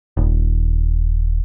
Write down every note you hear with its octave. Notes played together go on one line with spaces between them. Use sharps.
D#1